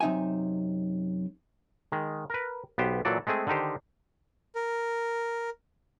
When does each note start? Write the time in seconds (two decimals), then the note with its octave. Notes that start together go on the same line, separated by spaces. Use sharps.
0.01 F#2 C3 D#4 E5 G#5
1.92 D#3 G#3
2.30 A#4 B4
2.78 B1 B3 G4 C5
3.05 A#2 E3 F#3 A4 D5
3.27 G#3 A3 C4 G#4
3.47 D3 D#3 D#4 G4 C5
4.55 A#4